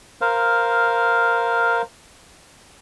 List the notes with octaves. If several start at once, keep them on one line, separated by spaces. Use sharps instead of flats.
A#4 C5 F5